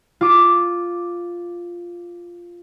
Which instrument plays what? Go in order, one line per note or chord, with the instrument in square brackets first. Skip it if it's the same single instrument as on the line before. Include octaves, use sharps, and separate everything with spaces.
[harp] F4 D6